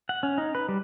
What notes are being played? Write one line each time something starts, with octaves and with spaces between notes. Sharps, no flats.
F#5
C#4
D#4
B4
G3